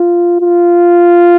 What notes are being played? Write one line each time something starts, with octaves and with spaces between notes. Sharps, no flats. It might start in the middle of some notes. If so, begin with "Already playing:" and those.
Already playing: F4
F4